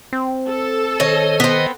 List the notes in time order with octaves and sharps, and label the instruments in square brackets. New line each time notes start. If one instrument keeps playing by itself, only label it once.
[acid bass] C4
[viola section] A4
[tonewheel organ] D#3 C5 D#5 [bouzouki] C#5
[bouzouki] B3 C4